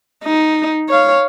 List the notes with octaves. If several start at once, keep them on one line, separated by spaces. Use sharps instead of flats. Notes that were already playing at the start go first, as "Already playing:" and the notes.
D#4
C#5 F5